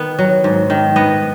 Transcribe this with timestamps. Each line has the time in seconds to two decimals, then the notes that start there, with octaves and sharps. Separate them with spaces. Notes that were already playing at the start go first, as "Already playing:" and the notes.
Already playing: D#3 B3
0.19 F#3
0.44 G#2
0.70 D#3
0.96 B3 D#5